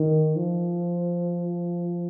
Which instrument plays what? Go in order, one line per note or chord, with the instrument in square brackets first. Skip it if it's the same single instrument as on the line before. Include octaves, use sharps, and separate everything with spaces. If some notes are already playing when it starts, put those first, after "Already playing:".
Already playing: [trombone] D#3
F3